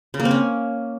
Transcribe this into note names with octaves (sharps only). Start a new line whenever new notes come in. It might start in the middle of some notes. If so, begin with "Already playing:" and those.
C#3
A#3
C4
C#4